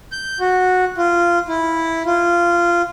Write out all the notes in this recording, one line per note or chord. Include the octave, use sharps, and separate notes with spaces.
G6
F#4
F4
E4
F4